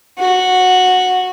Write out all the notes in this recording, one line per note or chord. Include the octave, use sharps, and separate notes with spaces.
F#4